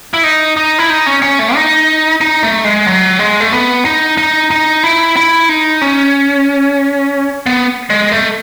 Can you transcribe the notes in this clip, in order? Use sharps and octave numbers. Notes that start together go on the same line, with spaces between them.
E4
D#4
D#4
E4
D#4
C#4
C#4
A3
D#4
D#4
A3
G#3
F#3
G#3
A3
B3
D#4
D#4
D#4
E4
E4
D#4
C#4
B3
G#3
A3